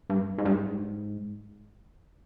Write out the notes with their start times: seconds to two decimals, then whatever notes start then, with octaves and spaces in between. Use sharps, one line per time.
0.10 G2
0.38 G#2
0.45 G2
0.53 G#2